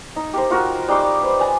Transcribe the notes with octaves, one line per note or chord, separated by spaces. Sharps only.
D#4
G4 A#4 C5
D#4 F4 F#4 A#4
G3 D#4 C6 D6
B4 C5
D5 G#5 A#5